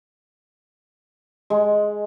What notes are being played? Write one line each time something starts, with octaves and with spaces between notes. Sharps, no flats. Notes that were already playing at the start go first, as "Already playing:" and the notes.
G#3